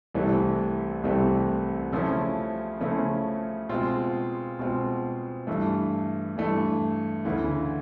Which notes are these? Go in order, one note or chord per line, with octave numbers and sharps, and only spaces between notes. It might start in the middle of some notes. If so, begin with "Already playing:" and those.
C2 C3 E3 A3 C4
C2 C3 E3 A3 C4
C#3 F3 A3 C#4 E4
C#3 F3 A3 C#4 E4
B2 G#3 C4 F4
B2 G#3 C4 F4
G2 E3 A3
G2 E3 A3
D2 C#3 E3